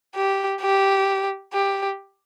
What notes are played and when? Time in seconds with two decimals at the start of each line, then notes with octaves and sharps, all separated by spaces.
0.15 G4
0.62 G4
1.53 G4